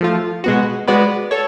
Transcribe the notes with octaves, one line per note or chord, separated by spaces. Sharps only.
F3 A3 F4
B2 G#3 B3 F#4
G#3 B3 F#4 B4 D5
A4 C#5